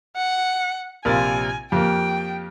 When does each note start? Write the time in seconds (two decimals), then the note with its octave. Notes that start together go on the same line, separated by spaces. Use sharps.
0.17 F#5
1.05 A#1 C3 F4 A#4 G#5 A6
1.72 F2 A#3 G4 G5